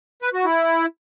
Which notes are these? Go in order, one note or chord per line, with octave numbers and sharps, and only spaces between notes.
B4
F#4
E4